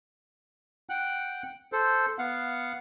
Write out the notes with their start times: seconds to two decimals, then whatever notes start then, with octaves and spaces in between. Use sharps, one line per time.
0.89 F#5 G5 F#6
1.72 A4 C5
2.18 B3 F5 F#5